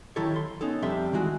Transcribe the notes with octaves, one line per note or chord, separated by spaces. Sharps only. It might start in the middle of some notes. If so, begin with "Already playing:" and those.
D#3 F#3 E4 G4 A4 C#5
C6
B3 C#4 D#4 A4
F2 C3 G3 E5 C6
D#3 E3 G#3 F#4